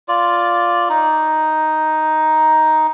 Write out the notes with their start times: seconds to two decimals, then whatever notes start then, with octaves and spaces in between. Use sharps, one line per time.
0.08 F4 D5
0.89 D#4